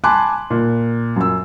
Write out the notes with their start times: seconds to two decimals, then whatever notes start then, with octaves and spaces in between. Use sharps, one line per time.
0.04 G#5 A5 B5 C6 D6 F#6
0.50 A#2
1.16 F#2 E6